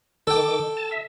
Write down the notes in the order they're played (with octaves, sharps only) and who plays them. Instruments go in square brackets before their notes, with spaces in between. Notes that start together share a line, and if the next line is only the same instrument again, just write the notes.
[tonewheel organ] D#3 D6 [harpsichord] A4 G5
[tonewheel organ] A5
E5